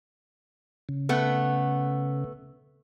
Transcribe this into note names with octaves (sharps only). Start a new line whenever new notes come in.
C#3
A3 B3